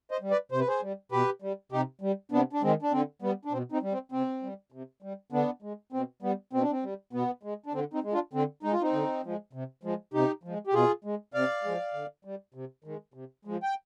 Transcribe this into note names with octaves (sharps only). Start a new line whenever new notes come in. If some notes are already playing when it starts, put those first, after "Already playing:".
C5 D#5
G3
B4 D5
C3 C5
B4
G#4 C5
G3
B2 G4 B4
G3
C3 D#4 G4
G3
C3 B3 D4
D4
D#3 G#3 C4
D4
D3 C4
G3 B3
D4
B2 C4
C4 D#4
G3
C4
C3 C4
G3
C3
G3
D3 B3 D4
G#3
B2 C4
G3 B3
B2 C4
D4
C4
G3
B2 B3
G#3
D4
D3 C4
C4 D#4
G#3
D4 F4
D3 C4
G#3 D#4
F4
C4 D#4
D3
F3 G#3
C3
F3 G#3
C3 D#4 G4
F3 G#3
G4
B2 F4 G#4
G#3
C3 D5 F5
F3 G#3
D3
G3
C3
D#3 G#3
C3
F3 G#3
G5